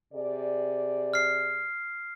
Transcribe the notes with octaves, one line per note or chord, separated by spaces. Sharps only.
C3 G#4 D5
F6 C7